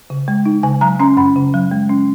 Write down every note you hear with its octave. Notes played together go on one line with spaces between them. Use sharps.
C#3
G#3
D#4
C#3 G#5
F#3 A#5
C#4 A#5
F#2 B5
C#3
F#3
G#3
C#4